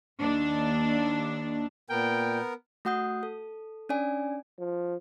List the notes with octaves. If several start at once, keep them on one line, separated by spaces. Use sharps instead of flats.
D#2 D4
A#2 B3 A#4 G5
A3 F#4 F#5 D#6 G6
A4
C#4 D4 D5 G#5
F3